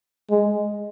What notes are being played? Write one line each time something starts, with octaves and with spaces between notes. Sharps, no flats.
G#3